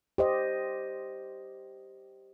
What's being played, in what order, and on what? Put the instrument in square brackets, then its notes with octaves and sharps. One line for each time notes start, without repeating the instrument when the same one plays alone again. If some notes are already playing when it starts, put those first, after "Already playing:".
[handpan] G4 C5 D#5